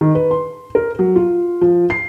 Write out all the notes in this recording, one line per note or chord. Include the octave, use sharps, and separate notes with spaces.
D#3
B4
C6
A#4
F#3
F4
F3
C7